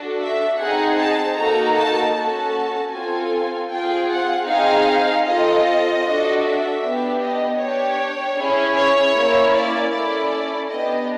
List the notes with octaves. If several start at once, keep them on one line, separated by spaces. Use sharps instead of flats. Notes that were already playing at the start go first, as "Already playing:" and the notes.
Already playing: D4 F#4 A4
E5
C4 D#4 G#4 F#5
A5
A#3 D#4 F#4 A4 A#5
A5
C#4 F#4 A4 A5
C4 F4 A4 G#5
C4 F4 G#4 G5
F#5
C4 D#4 G#4 F5
C4 F4 A4 D#5
D4 F#4 A4
E5
B3 D4 G4
D#5
D4 G4 C#5
C#4 E4 G#4
C#5
A#3 C#4 E4
D5
C#4 E4 A4 D5
B3 D4 G4 D#5